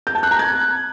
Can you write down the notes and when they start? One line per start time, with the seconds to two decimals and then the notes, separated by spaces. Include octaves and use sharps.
0.07 G6
0.15 A5
0.23 F#6
0.31 A#5
0.39 G#6